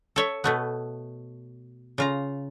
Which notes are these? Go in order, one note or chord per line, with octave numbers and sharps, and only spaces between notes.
A4 C#5 E5
B2 A3 B3
C#3 F4 A#5